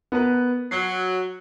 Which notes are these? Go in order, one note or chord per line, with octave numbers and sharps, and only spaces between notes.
B3 A#4 B4
F#3 C7